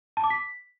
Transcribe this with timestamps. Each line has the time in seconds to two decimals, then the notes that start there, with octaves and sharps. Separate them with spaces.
0.17 A5
0.24 D6
0.30 B6